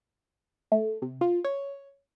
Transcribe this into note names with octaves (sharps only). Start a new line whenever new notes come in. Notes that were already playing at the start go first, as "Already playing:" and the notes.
A3
C3
F4
C#5